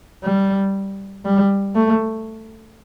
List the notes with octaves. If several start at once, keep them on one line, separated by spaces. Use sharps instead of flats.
G3
G3
A3